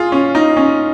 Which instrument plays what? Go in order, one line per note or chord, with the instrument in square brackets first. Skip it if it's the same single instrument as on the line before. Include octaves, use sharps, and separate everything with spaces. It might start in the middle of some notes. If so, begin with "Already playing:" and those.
Already playing: [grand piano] F4 G#4
C#4
D#4
C#4